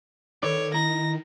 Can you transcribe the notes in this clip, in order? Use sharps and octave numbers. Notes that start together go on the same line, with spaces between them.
D#3 A4 B4 C#5 D5
E4 D#5 A#5 A#6